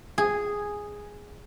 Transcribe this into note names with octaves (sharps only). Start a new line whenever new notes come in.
G#4